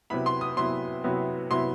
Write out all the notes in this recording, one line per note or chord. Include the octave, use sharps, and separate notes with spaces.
C3 F#3 B3 E4 B5
C6
D#6
C3 F#3 B3 E4 C6
C3 F#3 B3 E4
C3 F#3 B3 E4 C6